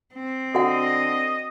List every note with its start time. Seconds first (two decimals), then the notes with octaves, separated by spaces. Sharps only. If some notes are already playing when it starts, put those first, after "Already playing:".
0.14 C4
0.55 D3 F#4 D#5 F#5